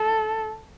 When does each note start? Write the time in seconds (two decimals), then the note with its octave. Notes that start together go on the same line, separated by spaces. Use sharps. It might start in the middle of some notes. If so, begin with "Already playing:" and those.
Already playing: A4